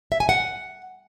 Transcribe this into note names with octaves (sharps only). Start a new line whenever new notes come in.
E5
G#5
F#5